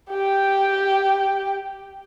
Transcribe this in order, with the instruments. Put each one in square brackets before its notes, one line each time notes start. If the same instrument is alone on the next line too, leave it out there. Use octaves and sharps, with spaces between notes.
[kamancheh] G4 G5